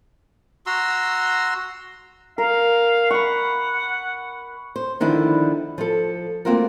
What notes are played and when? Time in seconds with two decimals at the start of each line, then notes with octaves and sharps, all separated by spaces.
0.66 F#4 A#5 C6 E6
2.38 A#4 F5
3.11 F#5 B5 C#6
4.76 C5
5.00 D3 D#3 F3 D4 E4
5.78 F3 A4
6.45 A3 A#3 C4 F4 F#4 A#4